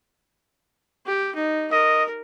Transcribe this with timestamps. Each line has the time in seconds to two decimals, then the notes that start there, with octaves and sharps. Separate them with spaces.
1.06 G4
1.35 D#4
1.72 A#4 D#5